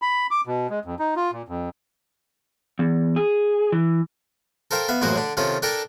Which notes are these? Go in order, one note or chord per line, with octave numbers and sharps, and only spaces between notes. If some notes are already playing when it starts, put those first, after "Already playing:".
B5
D6
B2
G#3
F2
D#4
F4
A#2
F2
E2
G#4
E3
A4 A#4 C5 F5 G5
B3 E5 F5
A1 F#2 A#3 F#4 G#4 C5
D3 D4
C3 D#3 C#4 F4 A4
D4 A4 A#4 G5 A5 A#5